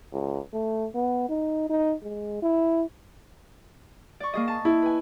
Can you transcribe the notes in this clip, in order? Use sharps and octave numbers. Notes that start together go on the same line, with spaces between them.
C#2
A3
B3
D#4
D#4
G#3
E4
D5 C#6
A#3 G#4 D#5
A5
E4
B4 G#5